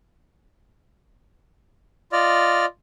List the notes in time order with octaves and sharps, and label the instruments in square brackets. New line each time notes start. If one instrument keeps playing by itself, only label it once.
[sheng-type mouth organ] F4 D5 D#5 F6